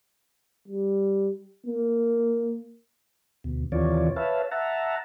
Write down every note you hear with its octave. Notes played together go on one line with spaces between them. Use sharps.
G3
A#3
D2 B2
D#2 C3 E3 F4 C#5 D5
B4 C#5 E5 F5 A5
E5 F#5 A5 A#5